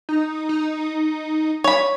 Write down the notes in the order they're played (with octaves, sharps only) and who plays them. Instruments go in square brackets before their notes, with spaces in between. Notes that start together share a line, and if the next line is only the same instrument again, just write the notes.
[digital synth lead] D#4
D#4
[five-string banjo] C#5 B5